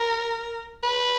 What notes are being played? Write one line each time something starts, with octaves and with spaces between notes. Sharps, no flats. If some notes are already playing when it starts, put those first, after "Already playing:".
Already playing: A#4
B4